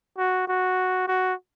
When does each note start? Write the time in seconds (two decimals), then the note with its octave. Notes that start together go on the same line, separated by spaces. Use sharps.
0.18 F#4
0.48 F#4
1.08 F#4